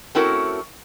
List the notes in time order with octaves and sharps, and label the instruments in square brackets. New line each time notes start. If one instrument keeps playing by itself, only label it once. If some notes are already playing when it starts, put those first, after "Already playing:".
[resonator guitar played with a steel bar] A3 C4 C#4 E4 F#4 A#4